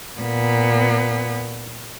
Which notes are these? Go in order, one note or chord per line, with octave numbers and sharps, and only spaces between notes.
A#2 B3